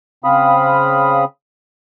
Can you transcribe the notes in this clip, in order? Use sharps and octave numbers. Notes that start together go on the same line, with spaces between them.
C#3 C4 F5 B5 D#6